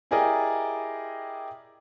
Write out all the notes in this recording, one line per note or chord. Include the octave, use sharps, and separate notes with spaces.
E4 G4 G#4 A#4 D5 D#5